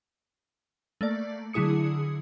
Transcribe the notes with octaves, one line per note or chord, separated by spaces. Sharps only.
A3 A#3 D5
D3 F#3 E4 G#4 D#6 C#7